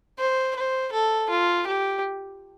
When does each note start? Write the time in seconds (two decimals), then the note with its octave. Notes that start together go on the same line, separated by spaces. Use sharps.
0.19 C5
0.56 C5
0.92 A4
1.30 F4
1.67 G4